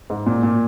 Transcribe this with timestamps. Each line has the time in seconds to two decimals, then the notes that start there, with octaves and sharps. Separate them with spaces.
0.10 G#2
0.26 A#2
0.43 A#2